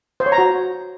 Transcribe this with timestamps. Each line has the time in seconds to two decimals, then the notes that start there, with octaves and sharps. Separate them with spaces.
0.20 C5
0.26 C#5
0.32 A#5
0.38 F#4